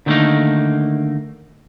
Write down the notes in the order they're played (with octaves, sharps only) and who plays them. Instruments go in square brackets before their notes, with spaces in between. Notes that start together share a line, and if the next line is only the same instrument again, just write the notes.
[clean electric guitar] D3 D#3 G3 A3 A#3 D#4